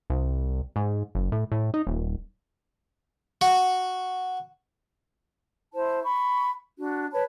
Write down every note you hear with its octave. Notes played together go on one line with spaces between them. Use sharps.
C2
G#2
F#1
A2
A2
D#4
D#1
F#4
E4 C5 A5
B5 C#6
D4 F#4
B4 C#5 A5 B5